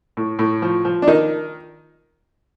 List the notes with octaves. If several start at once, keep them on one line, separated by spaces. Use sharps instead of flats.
A2
A2
F3
F3
D4
D#3 D#4